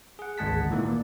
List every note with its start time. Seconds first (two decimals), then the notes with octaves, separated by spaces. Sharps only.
0.19 G#4 F#5
0.38 G#1 D2 G#3 F#5 A5 B6
0.70 A#2 D#3 E3 A3 A#3
0.86 D5